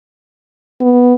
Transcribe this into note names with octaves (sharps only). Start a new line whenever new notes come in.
B3